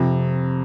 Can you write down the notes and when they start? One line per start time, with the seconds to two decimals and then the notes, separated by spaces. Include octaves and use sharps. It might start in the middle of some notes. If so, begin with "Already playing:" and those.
Already playing: F2 C3